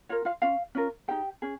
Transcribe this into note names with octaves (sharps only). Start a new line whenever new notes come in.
F4 A#4 C#5
F4 F5
C#4 F4 F5
C#4 F4 A#4
D#4 G4 G#4 G5
C#4 G#4